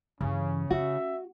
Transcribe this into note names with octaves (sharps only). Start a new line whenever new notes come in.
G2 C#3 E3 C#4
C#4 F#4 E5